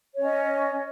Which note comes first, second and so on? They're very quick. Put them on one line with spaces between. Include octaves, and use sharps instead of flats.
C#5 C#4 D#5